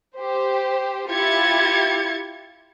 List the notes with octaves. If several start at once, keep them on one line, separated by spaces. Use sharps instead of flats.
G4 C5
E4 F4 G4 G#6 A6 C#7